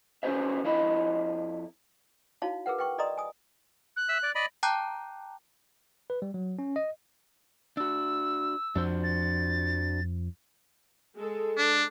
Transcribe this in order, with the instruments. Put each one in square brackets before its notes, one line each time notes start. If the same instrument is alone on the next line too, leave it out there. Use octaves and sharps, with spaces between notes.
[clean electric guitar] C#4 F#4 G#4 B4 C5 E5
F2 E4 D#5 B5
[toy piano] D#4 E4 F#4 C#5 F5 A5
G#4 A#4 B4 F#5
B4 G5 C#6
A4 D5 D#5 A#5 C6 D#6
G#5 D#6
[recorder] F#6
[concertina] E5 E6
D5
D5 D#5 B5
[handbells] G5 A5 A#5 D6 F#6 G6
[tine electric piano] B4
G3
F#3
C#4
D#5
[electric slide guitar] D4 F#4 [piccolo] E6
[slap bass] F2 F3 [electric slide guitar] D4 F#4 C5
[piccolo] A6
[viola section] G#3 A4
[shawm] D4